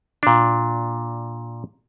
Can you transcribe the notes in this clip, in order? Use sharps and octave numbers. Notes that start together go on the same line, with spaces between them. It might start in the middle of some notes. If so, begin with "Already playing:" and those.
A#2 D4